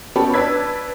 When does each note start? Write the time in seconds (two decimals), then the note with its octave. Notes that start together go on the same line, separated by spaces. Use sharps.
0.16 B3 C#4 G4 A4 B5
0.34 D4 B4 E6 G#6 B6